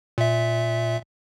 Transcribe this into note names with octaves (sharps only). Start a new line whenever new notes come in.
A#2 E5